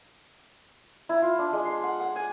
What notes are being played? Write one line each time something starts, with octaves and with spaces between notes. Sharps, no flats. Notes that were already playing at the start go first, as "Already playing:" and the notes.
E4
F4
D4
G#3
C6
F#5
F#5
G#5